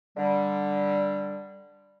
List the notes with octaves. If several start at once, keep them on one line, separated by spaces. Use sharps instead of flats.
D3 G3